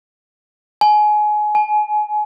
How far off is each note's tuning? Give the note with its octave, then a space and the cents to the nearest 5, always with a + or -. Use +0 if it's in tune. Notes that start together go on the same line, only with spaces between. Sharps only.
G#5 +25
G#5 +35